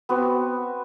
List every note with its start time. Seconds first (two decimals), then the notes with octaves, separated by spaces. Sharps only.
0.09 B3 C4 F#4